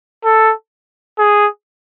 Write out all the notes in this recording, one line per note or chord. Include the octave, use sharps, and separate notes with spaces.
A4
G#4